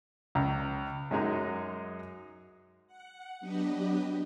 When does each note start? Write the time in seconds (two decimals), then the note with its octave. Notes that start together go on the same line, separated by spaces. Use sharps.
0.35 C#2
1.11 F#2 F#3 G#3 D#4
2.87 F#5
3.40 F#3 B3 D4 G4 B4 D#5